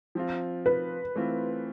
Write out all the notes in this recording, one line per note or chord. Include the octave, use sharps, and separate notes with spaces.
F3 C4 F4
B4
E3 A3 C4 F4